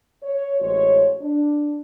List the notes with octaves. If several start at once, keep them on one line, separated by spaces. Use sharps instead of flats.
C#5
A1 G#3 F#4 C5 C#5
D4